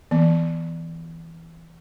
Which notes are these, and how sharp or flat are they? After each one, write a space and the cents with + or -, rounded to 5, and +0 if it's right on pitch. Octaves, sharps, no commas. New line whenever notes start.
E3 +0 B3 +0